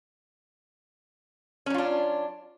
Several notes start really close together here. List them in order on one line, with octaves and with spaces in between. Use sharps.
C#4 F#3 F4 D4